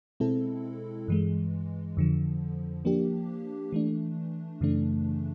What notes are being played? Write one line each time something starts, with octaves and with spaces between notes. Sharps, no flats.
B2 G#3 C4 E4 A4
G2 E3 G#3
F2 D3 F3
F3 A#3 D4 G4
E3 A3 D4
F#2 C#3 E3 A3 D4